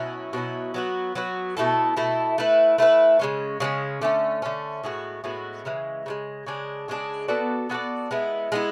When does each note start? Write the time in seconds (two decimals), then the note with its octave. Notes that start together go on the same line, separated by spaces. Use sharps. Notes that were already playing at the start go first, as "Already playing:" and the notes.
Already playing: B2 F#3 C#4 E4
0.33 B2 F#3 C#4 E4
0.74 F#3 B3 F#4
1.15 F#3 B3 F#4
1.57 B2 A3 E4 A4
1.96 B2 A3 E4 A4
2.38 A3 E4 B4
2.78 A3 E4 B4
3.19 C#3 G#3 C#4
3.60 C#3 G#3 C#4
4.02 D3 A3 C#4
4.42 D3 A3 C#4
4.83 A2 G#3 B3 F#4
5.24 A2 G#3 B3 F#4
5.65 C#3 E3 G#3
6.06 C#3 E3 G#3
6.46 C#3 G#3 D4 G#4
6.88 C#3 G#3 D4 G#4
7.28 B3 F#4 A4 D5
7.69 B3 F#4 A4 D5
8.11 G#3 B3 E4
8.52 G#3 B3 E4